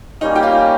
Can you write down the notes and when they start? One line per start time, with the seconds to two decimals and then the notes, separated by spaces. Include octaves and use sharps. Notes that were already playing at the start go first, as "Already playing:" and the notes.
0.21 G3 A#3 C#4 D#4
0.35 G4
0.43 F4